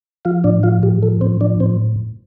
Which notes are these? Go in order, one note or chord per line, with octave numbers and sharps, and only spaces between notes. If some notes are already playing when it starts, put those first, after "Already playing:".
F3 F4 F5
A2 D4 D5
F3 F4 F5
A2 G4
F3 A4
A2 C4 C5
F3 D4 D5
A2 C4 C5